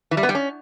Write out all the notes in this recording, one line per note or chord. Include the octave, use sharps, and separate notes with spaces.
E3
G3
B3
G3
C#4